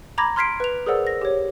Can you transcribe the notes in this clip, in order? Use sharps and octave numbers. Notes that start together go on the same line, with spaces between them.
A#5 B5 D6 G#6 A#6
C6 F6 G#6 B6 C7 D7
B4 F7
G#4 A#4 C5 D5 F#5 E6
A#6
G4 C#5